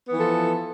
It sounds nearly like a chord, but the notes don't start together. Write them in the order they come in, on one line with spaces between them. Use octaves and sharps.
B3 E3 F3 A4